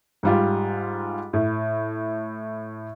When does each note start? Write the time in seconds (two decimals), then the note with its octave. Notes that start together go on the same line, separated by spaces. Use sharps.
0.23 G#2 G3 F4
1.33 A2